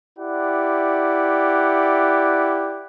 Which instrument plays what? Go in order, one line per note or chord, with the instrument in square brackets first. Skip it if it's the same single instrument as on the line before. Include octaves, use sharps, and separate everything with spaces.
[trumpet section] E4 G4 D5 F#5